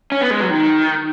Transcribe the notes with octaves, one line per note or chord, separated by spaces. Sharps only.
C#4
B3
G#3
F#3
D#3